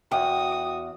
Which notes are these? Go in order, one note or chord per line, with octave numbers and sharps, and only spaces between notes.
E2 F#4 G5 D#6